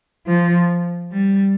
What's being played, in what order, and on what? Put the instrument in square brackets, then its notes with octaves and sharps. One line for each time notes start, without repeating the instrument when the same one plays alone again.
[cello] F3
G3